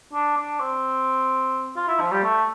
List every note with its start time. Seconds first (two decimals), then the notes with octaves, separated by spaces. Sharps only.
0.13 D4
0.37 D4
0.60 C4
1.76 F4
1.88 E4
2.00 F3
2.11 G3
2.23 A3